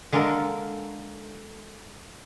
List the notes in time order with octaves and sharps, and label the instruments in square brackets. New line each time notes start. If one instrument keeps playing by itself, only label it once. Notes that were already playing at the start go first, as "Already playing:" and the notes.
[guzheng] D3 G#3 A#3 D4 A4 A#4